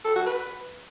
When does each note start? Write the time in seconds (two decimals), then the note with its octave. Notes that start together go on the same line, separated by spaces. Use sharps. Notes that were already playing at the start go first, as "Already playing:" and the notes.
0.05 A4
0.15 F#4
0.26 B4